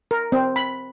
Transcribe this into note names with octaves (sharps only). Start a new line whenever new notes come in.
A#4
C4
B5